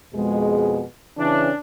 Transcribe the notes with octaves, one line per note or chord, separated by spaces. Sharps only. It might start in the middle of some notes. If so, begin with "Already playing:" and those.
F2 B2 G#3
C#3 E3 C#4 D4